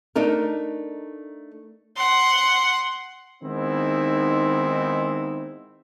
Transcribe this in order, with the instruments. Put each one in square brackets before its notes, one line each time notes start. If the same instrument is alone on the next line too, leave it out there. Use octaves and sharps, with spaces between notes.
[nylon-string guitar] A3 D4 D#4 A#4
[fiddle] F#5 C6
[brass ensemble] D#3 G#3 B3 C4 D#4 E4